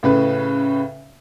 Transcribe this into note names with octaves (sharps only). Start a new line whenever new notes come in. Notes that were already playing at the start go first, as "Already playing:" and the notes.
A2 C#3 B4